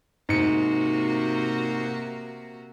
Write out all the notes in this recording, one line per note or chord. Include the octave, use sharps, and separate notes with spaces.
G#2 C3 A#3 F#4 C#7